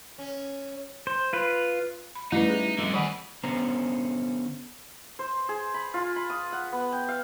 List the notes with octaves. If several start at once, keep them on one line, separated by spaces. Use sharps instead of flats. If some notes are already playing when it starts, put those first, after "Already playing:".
C#4
C5
F4 B4
B5
G3 A3 C#4 D#4 E4 B4
G#4
F2 D3 G3 D#5
D#3 E3 G#4 B4 F#5
D3 B3 C#4 C5 A#5
C5
G#4
B5
F4
B5
D#6
F#5
B3
G5
F5